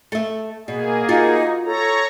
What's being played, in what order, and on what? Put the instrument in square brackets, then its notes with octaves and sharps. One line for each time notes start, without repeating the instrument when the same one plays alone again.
[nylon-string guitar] A3 E5
[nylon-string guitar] B2 [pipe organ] A#3 G#4
[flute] D#4 [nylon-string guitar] F4 F#4
[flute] A4 [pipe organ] C#5 A#5